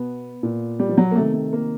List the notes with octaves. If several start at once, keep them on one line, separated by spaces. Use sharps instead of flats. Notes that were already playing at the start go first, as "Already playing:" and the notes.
Already playing: B2 B3
A#2
G3
F3
F#3
A#3
C3 D#3 A3
A3
A#3